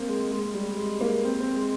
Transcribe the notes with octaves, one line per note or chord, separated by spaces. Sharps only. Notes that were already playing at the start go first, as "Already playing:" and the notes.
Already playing: A#3 C4
G#3
G#3
G3
G#3
A#3
C4
C4
G#3